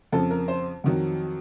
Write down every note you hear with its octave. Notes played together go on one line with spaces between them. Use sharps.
F2 C#3 F3 A4
A#4
C5
F2 D#3 F#3